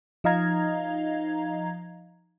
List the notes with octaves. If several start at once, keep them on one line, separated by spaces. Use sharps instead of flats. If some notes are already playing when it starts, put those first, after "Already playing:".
F3 D#4 D#5 F5 A#5 G#6